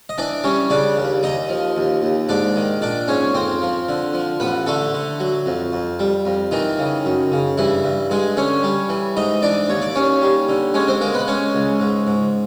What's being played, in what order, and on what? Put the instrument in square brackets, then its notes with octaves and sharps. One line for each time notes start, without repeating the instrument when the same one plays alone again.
[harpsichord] D#5
E3 D4 D5
G3 C#4 C#5
C#3 D4 D5
D#2
D#2 D#4 D#5
F3
D#2
D#2
G#2 D4 D5
D#3
A#1 D4 D5
G#2 C#4 C#5
F2 C4 C5
F3
D3
F3
A1 B3 B4
D3 A3 A4
D3
F#3
F2
F2
G3
F2
D#3 E3 D#4
C#3
F#2
C#3
G2 E3 E4
G2
G2 G#3 G#4
D3 C#4 C#5
G3
E3
G#2 D#4 D#5
E3 D4 D5
D#2 C#5
D5
D#2 C#4 C#5
G3
D3
G#3 C#4 C#5
C4 C5
G#3 A#3 A#4
B3 B4
G#3 C#4 C#5
C#2
G#2
G#2